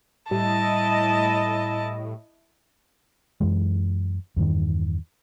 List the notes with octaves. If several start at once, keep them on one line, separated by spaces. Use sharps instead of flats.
A2 G3 E4 D#5 A5
F#2 E3 G#3
E2 G2 D#3